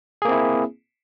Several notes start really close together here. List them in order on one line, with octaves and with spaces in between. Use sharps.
G#4 A#3 C4 E4